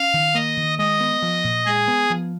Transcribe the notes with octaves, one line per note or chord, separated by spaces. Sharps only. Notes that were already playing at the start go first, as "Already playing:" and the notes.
Already playing: C#4 F5
D#3
A#3 D#5
D#3
G#3 D#5
B3
F3
A#2
G#3 G#4
B3
F3